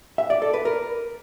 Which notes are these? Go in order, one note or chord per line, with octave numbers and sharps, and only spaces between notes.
E5
D5
A4
B4
A#4